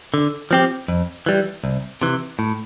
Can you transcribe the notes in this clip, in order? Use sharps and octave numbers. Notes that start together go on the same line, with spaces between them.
D3
F3 C4 G4
F2
E3 G3
C2
C3 E3
A2